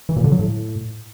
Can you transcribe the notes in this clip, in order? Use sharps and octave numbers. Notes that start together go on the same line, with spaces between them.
E3
A#2
D3
F#3
A2